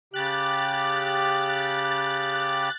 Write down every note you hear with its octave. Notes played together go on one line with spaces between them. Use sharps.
C#3 G4 F#6 A6